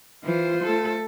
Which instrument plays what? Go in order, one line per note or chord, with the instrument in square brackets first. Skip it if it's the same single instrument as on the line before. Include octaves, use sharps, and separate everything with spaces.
[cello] E3 [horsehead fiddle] F4 C5
[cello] A3 A4